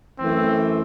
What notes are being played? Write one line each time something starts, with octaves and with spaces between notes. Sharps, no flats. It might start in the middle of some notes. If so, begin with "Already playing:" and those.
F#2 E3 A3 C4